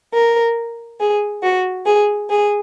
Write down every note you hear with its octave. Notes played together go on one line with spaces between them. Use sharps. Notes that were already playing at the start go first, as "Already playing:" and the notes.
A#4
G#4
F#4
G#4
G#4